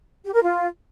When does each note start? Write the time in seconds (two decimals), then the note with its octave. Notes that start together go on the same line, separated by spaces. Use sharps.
0.24 G4
0.33 A#4
0.42 F4